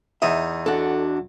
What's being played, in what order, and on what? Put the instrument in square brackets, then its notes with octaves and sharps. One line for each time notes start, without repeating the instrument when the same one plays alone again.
[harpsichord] E2 D#4 D#6 [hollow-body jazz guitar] E5
[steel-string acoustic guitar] D4 F#4 [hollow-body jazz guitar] A4 F#5